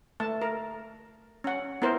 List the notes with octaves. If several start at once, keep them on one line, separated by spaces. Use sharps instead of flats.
A3 A5
A#4
C#4 F#5
B3 E4 A#4 C5